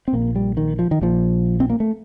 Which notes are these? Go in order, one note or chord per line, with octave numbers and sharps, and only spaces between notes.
C4
A#1 A#2 A#3
G3
D#3
F3
D#3
A#1 A#2 F3
C4
A#3
A3